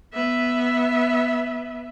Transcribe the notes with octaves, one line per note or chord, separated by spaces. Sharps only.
B3 E5